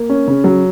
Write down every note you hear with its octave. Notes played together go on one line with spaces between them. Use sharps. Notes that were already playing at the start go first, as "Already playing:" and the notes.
Already playing: A#3
C#4
C#3
F#3